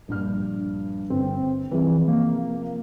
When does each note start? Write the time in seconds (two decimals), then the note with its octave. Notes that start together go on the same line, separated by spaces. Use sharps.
0.08 A#1 G2 F6
1.10 G1 C4
1.71 C3 E3 F3 G#4
2.08 A#3